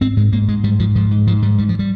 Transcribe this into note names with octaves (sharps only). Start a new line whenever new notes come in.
G#2 C4
G#2 G#3
G#2 A#3
G#2 G#3
G#2 G3
G#2 F3
G#2 F3
G#2
G#2 F3
G#2 G3
G#2 G3
F3
G3